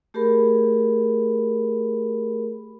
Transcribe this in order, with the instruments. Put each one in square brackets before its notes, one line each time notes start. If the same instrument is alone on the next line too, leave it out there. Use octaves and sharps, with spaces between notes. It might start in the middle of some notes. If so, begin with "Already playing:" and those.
[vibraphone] A3 G4 G#4 A#4 B5